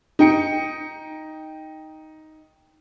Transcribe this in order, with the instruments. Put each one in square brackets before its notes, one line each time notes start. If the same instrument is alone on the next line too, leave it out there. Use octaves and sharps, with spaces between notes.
[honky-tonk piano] D#4 G5 C#7